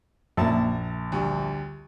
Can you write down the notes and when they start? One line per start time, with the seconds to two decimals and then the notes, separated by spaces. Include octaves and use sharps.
0.37 A#1 F#2 A#3 E5 A5 A#5
1.12 D2 G3